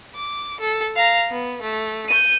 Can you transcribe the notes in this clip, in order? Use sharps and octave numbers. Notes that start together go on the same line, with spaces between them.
D6
A4
F5 A#5
B3
A3
G6 D#7